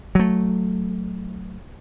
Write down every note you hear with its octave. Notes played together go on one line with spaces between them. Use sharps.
F#3 A3